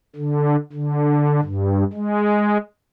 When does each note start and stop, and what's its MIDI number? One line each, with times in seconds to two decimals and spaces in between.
0.16 0.56 50
0.73 1.40 50
1.42 1.84 43
1.93 2.58 56